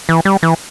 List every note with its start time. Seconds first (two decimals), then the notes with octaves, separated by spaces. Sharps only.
0.09 E3
0.25 G3
0.43 E3